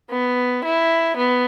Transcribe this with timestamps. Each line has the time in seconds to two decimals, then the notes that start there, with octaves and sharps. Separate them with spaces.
0.11 B3
0.64 E4
1.17 B3